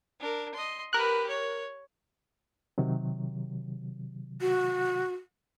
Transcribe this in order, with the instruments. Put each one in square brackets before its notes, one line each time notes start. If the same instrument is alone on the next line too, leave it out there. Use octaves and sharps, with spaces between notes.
[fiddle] D4 A#4
D#5 C6
[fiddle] G4 B4 [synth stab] A#4 F#6
[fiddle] C#5
[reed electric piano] C3 D#3 F#3
[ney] F#4